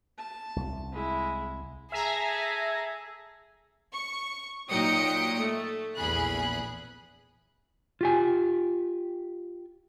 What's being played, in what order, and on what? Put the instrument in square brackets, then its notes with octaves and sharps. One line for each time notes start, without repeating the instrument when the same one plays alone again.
[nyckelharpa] A5
[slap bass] C2
[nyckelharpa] G#3 E4
[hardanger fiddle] G#4 A4 [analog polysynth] E5 G#5 A#5
[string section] C#6
A#2 F#3 D#4 G5 D#6 C#7
A3
A#1 E2 G#4 B5 F#6
[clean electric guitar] F4 G4 G#5